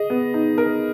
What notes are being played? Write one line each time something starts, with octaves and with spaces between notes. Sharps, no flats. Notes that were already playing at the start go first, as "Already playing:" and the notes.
Already playing: G#4 D#5
B3
D#4
A#4